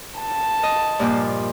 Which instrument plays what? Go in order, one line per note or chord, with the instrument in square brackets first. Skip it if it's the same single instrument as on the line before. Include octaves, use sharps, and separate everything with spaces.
[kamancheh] A5
[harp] D#5
G2 A#2 F3